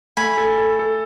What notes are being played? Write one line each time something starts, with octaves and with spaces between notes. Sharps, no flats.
A3 G#5 B5
A4
A4
A4